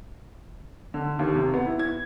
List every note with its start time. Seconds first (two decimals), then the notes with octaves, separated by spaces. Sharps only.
0.94 D3
1.19 D#2
1.35 C3
1.54 B3
1.66 E4
1.79 G#6